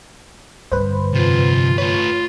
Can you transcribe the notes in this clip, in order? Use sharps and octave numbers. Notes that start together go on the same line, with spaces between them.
G2 D3 B4 C5
C3 F3 F4
A3 F4 B4 C#5